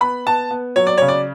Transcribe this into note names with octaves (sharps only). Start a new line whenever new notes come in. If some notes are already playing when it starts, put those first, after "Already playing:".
B3 B5
B3 A5
B3
F#3 C#5
D5
C#3 C#5
D5